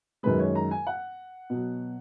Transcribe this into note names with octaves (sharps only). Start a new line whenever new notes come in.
F#2 D#3 G#3 B4
C#5
A#5
G#5
F#5
B2 F#3